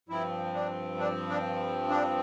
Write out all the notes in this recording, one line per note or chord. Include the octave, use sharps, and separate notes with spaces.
G2 F3 C4 E4
D4
D4
D4
D4